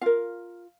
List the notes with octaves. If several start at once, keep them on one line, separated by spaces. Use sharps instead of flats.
F4 A#4 F5